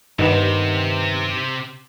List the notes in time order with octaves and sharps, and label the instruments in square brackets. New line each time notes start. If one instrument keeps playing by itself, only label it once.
[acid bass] G2 [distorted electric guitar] C3 [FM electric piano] D#3 B3